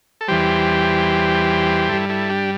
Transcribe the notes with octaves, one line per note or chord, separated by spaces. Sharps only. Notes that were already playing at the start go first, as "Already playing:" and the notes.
A4
E2 E3 G3 G4 C5
G2 G3 E4 A4
E4 A4
D4 G4